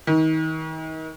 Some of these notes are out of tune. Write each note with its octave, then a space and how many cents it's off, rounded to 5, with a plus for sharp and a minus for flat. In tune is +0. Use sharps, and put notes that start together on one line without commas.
D#3 +35